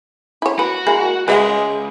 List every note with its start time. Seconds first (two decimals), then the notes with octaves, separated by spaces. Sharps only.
0.42 E4 C#5
0.59 F#4 B4
0.87 G#3 A#3 E4
1.28 C#2 G#3 B4 E5 F#5